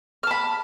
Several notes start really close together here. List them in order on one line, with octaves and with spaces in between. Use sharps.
F6 A5 B5